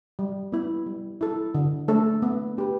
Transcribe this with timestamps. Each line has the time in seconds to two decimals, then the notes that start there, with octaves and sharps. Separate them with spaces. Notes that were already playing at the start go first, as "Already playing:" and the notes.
0.19 G3
0.52 B3 E4
0.86 G3
1.21 E4 A4
1.55 D3
1.88 A3 D4 A4
2.22 B3
2.57 D4 G4 B4